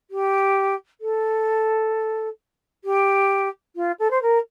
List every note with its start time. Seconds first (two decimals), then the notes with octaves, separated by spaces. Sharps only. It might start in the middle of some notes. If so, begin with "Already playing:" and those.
0.11 G4
1.01 A4
2.84 G4
3.76 F4
3.99 A4
4.11 C5
4.22 A#4